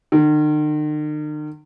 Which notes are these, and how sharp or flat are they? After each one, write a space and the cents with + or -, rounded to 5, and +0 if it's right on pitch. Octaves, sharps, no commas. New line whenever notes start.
D#3 -45